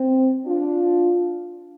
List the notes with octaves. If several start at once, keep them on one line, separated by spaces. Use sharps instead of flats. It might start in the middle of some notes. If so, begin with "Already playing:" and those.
Already playing: C4
D4 F4